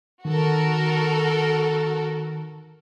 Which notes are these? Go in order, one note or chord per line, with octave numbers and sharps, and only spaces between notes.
D#3 F#4 A4 A#4